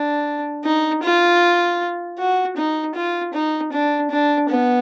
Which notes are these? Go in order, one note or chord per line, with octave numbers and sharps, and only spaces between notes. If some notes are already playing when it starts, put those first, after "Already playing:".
Already playing: D4
D#4
F4
F#4
D#4
F4
D#4
D4
D4
B3